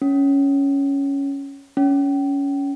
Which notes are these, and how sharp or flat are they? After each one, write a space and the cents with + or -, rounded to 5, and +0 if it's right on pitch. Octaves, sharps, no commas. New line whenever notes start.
C#4 +5
C#4 +15